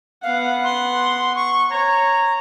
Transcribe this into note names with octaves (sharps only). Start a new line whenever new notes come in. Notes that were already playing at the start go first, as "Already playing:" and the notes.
B3 F5 F#5
C6
C#6
C#5 A#5